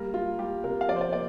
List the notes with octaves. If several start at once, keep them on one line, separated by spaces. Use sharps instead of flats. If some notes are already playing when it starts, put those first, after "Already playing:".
Already playing: G3 A#3 A#4
G3 F4
G3 G4
C3 A#4
F5
F3 D5
C5
D5
A#3 D5